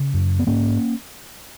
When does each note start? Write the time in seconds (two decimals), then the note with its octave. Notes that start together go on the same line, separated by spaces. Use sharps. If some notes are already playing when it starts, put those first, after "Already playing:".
Already playing: C#3
0.14 F#2
0.39 B3
0.47 G#2 A#3 C#4